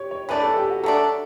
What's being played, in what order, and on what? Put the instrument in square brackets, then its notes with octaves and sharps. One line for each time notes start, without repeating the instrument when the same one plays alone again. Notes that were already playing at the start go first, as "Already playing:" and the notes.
Already playing: [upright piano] G4 C#5
C#5
[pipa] E3 A3 D4 [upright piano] B4
[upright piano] A4
G4
F#4
[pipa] F#3 A3 D4 [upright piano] A4